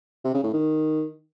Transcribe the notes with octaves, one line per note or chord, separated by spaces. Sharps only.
C3
C#3
A2
D#3